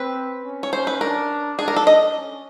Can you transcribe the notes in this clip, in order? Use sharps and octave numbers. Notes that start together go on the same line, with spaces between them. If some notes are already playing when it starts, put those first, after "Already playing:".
Already playing: C4 B4
C#4
C#5
C#4 C5
B4
D4 A#4
D4 G#4
A#4
A4
D4 D#5
C#4